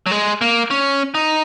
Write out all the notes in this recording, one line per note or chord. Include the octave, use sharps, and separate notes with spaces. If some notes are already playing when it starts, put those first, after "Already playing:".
F#3
G#3
A#3
C#4
D#4